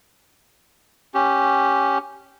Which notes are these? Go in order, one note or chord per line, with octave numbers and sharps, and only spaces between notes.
C#4 G4